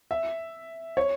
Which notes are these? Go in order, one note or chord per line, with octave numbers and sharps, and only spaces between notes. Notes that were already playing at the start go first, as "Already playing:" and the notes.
E5
C#5